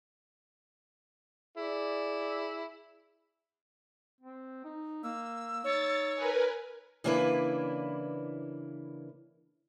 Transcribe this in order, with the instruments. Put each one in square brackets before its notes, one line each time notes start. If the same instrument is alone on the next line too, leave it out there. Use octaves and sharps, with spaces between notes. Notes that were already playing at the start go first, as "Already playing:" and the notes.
[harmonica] E4 [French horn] G#4 [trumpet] D5
[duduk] C4
D#4
[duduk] A#3 [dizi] E6
[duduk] D#4 [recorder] C#5 [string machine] A6
[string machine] A#4 B4 G#5
[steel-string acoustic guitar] C#3 E3 A#3 D4 E4 B4